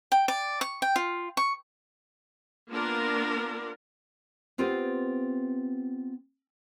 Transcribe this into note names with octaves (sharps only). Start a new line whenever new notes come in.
G5
D5
C#6
G5
F4
C#6
A#3 B3 D4 F4 A#4
B3 C4 F4 G4 B4 C5